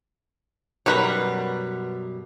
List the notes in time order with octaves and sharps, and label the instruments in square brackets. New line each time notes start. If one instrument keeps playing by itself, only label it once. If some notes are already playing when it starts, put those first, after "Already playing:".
[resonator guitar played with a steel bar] F#2 B2 G3 [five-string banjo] A#4 B4 C#5